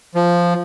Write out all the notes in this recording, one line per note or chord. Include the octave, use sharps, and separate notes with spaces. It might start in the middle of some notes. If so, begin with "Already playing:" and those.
F3